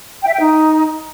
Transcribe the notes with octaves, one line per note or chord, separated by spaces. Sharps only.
G5
E5
G5
D#4